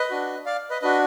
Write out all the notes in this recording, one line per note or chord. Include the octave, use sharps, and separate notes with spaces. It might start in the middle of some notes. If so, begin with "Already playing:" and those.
Already playing: B4 D#5
D4 F#4
D5 F5
B4 D#5
D4 F#4 B4 D#5